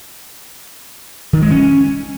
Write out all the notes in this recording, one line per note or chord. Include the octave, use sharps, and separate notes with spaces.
D#3
G#3
C#4